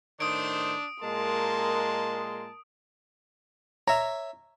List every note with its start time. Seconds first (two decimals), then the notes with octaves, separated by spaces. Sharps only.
0.20 A2 D#3 D4 C5 D#6 D7
1.04 A#2 G#3 A#4 A5 C6
3.88 C#5 E5 A#5